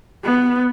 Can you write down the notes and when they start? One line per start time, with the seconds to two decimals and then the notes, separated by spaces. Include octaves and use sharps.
0.24 B3